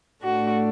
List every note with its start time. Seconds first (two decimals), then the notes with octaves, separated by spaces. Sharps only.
0.23 A2 A3 D4 F#4